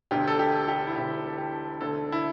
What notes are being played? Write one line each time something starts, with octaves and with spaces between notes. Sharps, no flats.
E1 D2 D3 G4
A4
G4
G4
E4
E1 D2 D3 G4
G4
E1 D2 D3 A4
E4